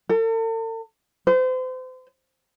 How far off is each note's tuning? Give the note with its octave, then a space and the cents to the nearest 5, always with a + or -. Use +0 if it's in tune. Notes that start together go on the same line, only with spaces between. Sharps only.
A4 +45
C5 -35